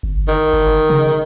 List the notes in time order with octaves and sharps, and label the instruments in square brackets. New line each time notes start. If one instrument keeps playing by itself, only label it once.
[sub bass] G1
[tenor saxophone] D#3
[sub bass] G1
C#3